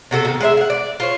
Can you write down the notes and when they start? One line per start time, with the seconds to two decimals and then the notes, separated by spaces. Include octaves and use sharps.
0.11 C3 F#4 A4
0.25 B2 D#3
0.40 G#3 G#4 D#5 E5
0.57 F5 F#5
0.70 D5
1.00 F4 C5 C#5